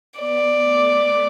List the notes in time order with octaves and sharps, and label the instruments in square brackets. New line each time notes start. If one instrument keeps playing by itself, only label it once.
[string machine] B3 [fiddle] D5
[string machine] A3